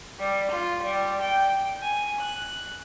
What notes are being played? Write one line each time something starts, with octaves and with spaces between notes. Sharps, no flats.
G3
F4
G3
G5
G#5
F#6